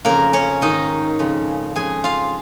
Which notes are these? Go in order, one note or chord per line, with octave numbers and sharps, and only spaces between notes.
F2 C#3 A#3 A#4
C#4 C#5
G#2 D#3 D#4 D#5
F2 C#3
F2 C#3 G#4 G#5
F4 F5